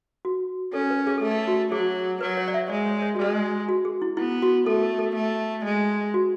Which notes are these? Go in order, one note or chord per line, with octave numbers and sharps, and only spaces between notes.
F#4
C#4 A4
B4
G#4
A4
A3 G#4
F#4
F#3 G#4
F#3 B4
C#5
D5
E5
G#3 D5
C#5
C#5
F#4
G#3 G#4
F#4
G#4
E4
B3 E4
F#4
A3 A4
A4
A4
A3
G#3
F#4